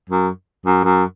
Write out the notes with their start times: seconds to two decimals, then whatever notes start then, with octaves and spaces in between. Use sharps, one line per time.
0.09 F#2
0.66 F#2
0.84 F#2